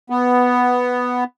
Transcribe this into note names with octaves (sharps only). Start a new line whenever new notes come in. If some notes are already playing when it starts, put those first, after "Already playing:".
B3